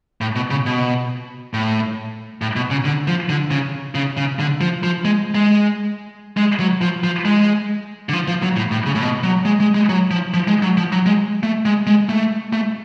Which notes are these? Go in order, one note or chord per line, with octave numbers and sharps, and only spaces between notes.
A2
B2
C#3
B2
A2
A2
B2
C#3
D3
F3
D3
C#3
C#3
C#3
D3
F3
F3
G#3
G#3
G#3
F#3
F3
F3
G#3
D3
F3
F3
F#3
A2
A2
C#3
A2
B2
F#3
G#3
G#3
G#3
F#3
F3
F3
G#3
F#3
F3
F#3
G#3
A3
G#3
G#3
A3
A3